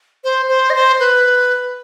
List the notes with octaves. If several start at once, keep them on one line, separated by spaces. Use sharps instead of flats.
C5
C5
D#5
C5
B4